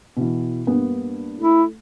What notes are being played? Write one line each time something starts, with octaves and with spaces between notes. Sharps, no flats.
B2 E3
G2 A#3 B3
A3 E4